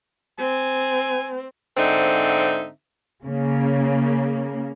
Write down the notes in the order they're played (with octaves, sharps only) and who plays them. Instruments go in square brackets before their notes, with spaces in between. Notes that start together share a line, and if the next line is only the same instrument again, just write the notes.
[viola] C4 [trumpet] G#5
[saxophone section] G#2 D3 C4 D#4 E5
[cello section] C#3 A#3